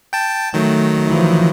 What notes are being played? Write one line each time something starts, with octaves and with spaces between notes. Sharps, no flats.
G5 A5
D#3 F#3 A3
E3 F3